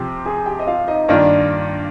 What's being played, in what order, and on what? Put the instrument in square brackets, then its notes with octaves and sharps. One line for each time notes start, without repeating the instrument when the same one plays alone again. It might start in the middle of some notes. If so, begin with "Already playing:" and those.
Already playing: [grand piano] C3 F3 C4 [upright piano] G4
[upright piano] G#4 G#5
G4 G5
D#5
F4 F5
D#4 D#5
[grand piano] G2 D#3 A#3 F4 [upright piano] D4 D5